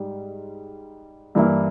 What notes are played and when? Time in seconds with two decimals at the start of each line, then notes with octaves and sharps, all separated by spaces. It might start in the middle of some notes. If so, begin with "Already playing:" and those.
Already playing: G#2 G3
1.35 G2 E3 A#3 E4